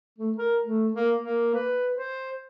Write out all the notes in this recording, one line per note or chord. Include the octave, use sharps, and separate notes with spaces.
A3
A#4
A3
A#3
A#3
B4
C5